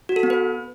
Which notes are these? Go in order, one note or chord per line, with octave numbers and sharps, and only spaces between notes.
F#4
A4
B3
B4